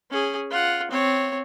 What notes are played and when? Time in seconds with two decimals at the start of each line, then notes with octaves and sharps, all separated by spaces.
0.11 C#4 G#4
0.50 F4 F#5
0.91 C4 C#5